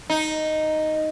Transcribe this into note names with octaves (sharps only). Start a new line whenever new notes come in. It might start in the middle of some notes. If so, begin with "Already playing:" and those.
D#4